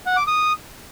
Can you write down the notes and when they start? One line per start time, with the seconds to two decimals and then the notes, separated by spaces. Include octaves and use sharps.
0.06 F#5
0.17 D6
0.27 D#6